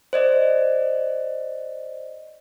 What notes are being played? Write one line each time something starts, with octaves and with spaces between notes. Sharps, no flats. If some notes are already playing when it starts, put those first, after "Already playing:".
C5 D5 D#5